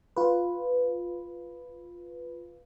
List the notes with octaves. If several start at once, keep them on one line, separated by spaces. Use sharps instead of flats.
F4 B4